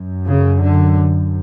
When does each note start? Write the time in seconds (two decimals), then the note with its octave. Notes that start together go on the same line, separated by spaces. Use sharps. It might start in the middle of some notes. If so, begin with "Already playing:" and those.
Already playing: F#2
0.26 C#3
0.62 D3